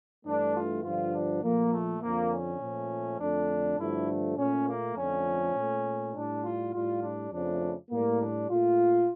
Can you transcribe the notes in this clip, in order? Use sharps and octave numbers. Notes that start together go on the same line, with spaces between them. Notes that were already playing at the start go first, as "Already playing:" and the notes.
G2 E3 A3 D4
F4
G2 D3 F3 F4
D4
A#2 F3 A3 A#3
A3
F2 D3 F3 A#3
C#4
A#2 F3 A3
F2 D3 A3 D4
G2 D3 F3 A3 E4
A#2 A3 C#4
A#3
F2 D3 F3 A3 C#4
A#2 A3
A2 G3 D4
F4
A2 G3 F4
D4
F2 C#3 F3 A3 D4
A2 G3 A#3
D4
A#2 A3 F4